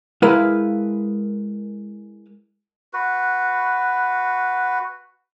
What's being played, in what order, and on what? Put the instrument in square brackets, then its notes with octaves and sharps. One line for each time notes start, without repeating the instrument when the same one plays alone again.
[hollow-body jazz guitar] G#3 E4 A#4 B4 F5
[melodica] F#4 B4